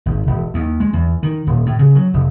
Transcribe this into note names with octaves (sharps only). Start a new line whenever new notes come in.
G#1
E1
D#2
G#3
E2
D#3
D#1
A2
C#3
F#3
F1